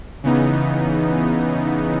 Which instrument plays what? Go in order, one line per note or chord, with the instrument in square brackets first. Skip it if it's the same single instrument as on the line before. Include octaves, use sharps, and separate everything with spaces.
[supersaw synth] C#3 E3 B3 D#4